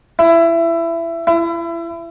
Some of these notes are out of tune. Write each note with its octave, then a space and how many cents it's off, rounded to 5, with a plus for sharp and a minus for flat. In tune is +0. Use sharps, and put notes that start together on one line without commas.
E4 +20
E4 +30